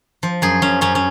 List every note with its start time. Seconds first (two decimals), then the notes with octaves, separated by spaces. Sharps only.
0.23 F3
0.42 F#2 G#4
0.62 F#2 C#4
0.81 F#2 C#4
0.95 C#4